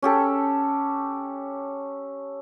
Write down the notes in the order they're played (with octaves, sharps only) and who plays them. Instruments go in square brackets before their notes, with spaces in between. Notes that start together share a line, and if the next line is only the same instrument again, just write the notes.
[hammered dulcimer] C#4 G4 A4